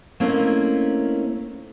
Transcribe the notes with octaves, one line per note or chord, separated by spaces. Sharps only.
A3 A#3 C4 C#4 D#4 E4